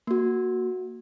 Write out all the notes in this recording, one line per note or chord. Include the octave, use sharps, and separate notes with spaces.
A#3 F#4